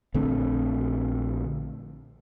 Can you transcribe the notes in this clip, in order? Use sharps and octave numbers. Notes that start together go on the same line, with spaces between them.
A#1 D3 A3 C4